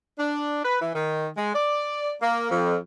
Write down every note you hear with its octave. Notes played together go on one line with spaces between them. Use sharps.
D4
B4
E3
D#3
G#3
D5
A#3
F2